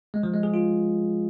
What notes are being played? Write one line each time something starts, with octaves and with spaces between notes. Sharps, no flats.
G#3
F3
G#3
G#4
F4